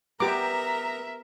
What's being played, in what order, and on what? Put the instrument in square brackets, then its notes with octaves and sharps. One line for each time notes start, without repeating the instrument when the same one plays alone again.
[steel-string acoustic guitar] B3 [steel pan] G4 D6 [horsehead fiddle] A#4 E5 [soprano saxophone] A#5